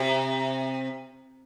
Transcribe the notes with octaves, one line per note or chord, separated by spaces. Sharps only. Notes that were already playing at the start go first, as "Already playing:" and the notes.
Already playing: C3